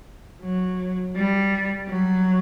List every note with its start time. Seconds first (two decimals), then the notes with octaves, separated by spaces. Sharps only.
0.42 F#3
1.16 G3
1.88 F#3